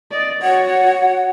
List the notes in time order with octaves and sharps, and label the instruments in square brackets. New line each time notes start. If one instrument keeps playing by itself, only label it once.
[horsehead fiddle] D5 D#5
[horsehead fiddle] F#4 C#5 [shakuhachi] F#5